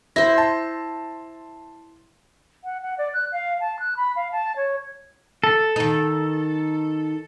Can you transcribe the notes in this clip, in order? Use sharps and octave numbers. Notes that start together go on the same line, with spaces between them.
E4 C5 A#6
A5 C6
F#5
F#5
D5
F#6
F5
A5
F#6
B5
F5
A5
C#5
A4
D#3 D#4